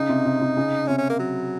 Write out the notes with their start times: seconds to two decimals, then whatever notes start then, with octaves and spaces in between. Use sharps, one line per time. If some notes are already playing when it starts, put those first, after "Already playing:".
Already playing: C#3 D#4
0.09 C3
0.25 C3
0.41 C3
0.57 C#3
0.88 C3 C#4
0.98 C#4
1.10 A#3
1.19 F#3